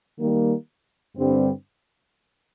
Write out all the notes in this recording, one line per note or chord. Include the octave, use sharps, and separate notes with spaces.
D#3 G3 A#3
G2 D3 G3 C4